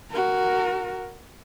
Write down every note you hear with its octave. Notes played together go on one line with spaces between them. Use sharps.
F#4 A#4